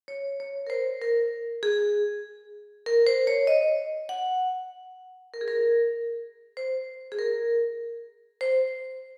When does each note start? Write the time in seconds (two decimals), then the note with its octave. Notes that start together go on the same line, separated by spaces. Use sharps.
0.08 C#5
0.40 C#5
0.67 A#4
0.70 C5
1.01 A#4
1.63 G#4
2.86 A#4
3.07 C5
3.27 C#5
3.47 D#5
4.09 F#5
5.34 A#4
5.41 G#4
5.48 A#4
6.57 C5
7.12 G#4
7.19 A#4
8.41 C5